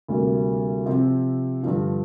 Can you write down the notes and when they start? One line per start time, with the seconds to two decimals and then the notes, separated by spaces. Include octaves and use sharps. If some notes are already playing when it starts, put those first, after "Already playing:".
0.08 D2 C3 G3 A#3
0.86 C3 F3 C4
1.63 G2 D3 F3